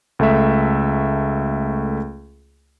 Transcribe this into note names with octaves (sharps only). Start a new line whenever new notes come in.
C#2 A3 A4 E5